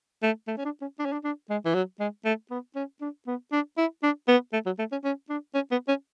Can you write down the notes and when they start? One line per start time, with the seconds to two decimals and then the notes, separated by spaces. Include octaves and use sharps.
0.23 A3
0.48 A3
0.57 C#4
0.65 D4
0.81 C#4
0.99 D4
1.05 C#4
1.13 D4
1.24 D4
1.50 G#3
1.65 E3
1.74 F#3
2.00 G#3
2.25 A3
2.51 B3
2.76 C#4
3.01 D4
3.27 B3
3.52 D4
3.78 E4
4.03 D4
4.28 B3
4.53 A3
4.66 F#3
4.79 A3
4.92 C#4
5.04 C#4
5.30 D4
5.55 C#4
5.71 B3
5.88 C#4